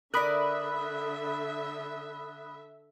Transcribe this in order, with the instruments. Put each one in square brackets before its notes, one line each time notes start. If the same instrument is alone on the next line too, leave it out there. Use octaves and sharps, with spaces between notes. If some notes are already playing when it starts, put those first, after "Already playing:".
[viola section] D3 E5 [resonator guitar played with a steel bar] A#4 D5 [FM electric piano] B5 D#6 F#6